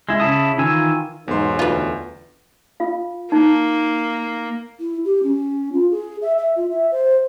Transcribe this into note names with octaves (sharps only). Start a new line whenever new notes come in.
G#3 E4
C#3 E4 A5 D#6
D#3 E3 F4 G#5 E6
B1 E2 G#2 C6
D2 F4 B4
F4 F5
A#3 D#4
E4
G4
C#4
F4
G#4
E5
E5
F4
E5
C5